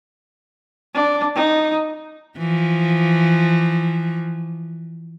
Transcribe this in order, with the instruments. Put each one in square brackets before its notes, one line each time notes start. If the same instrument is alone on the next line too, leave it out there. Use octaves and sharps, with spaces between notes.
[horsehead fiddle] D4
D#4
[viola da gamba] E3 F3